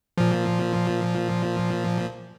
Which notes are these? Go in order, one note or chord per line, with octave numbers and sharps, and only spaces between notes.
A#2 F3